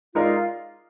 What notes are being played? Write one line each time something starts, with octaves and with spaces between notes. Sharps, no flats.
G#3 D#4 F4 A#4 D5